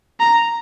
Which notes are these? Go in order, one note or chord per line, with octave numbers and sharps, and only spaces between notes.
A#5